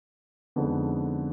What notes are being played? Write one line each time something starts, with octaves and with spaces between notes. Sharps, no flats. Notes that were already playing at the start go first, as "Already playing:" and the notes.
F2 D3 G#3 B3 D#4